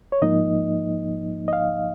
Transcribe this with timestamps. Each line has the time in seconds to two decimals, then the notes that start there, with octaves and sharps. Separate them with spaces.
0.12 C#5
0.22 G#2 F3 A#3 D#4 D#5
1.48 D#5
1.53 F5